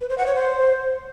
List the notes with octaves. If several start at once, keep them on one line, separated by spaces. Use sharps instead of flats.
B4
C5
F#5
C#5
C5